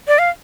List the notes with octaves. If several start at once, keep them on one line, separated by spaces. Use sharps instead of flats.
D5
F5